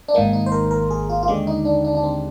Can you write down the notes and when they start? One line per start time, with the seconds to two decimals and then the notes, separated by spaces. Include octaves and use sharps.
0.08 D4
0.14 G#1 G#2 D#3 A#3 D#4
0.33 D#4
0.46 C5
0.52 A#4
0.71 A#4
0.90 G#4
1.09 F4
1.23 F4
1.28 D#2 D3 G#3 G4
1.47 D#4
1.65 D4
1.84 D4
1.95 D4
2.03 C4